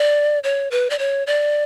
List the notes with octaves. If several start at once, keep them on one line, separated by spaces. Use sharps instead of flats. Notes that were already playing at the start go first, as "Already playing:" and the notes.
Already playing: D5
C#5
B4
D5
C#5
D5